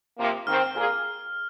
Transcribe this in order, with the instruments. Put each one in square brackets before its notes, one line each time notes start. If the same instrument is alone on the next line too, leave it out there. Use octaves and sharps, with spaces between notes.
[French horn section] C3 F3 A#3
[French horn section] G#2 D#3 C4 [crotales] F6
[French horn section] A#2 A#3 F4 G#4